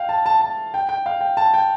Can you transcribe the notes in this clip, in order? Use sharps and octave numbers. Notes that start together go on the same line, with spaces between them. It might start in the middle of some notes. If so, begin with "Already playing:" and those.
Already playing: F5 G5
A5
A5
A5
G5
G5
F5
G5
A5
G5